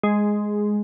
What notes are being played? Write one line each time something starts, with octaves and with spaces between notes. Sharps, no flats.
G#3